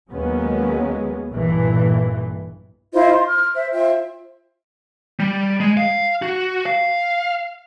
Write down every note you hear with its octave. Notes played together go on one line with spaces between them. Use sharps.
D#2 F#3 G#3 B3 C#4
B1 G2 A#2 E3
E4 F4 C5 D#5
C6
F6
C5 E5
F4 C5 E5 G5
G3
G#3
F5
F#4
F5